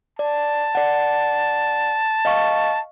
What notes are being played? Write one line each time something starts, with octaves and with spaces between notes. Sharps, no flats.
D5 A5
D5 F#5
D#5 F5 C#6